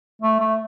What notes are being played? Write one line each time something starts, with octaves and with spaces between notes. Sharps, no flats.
A3
A3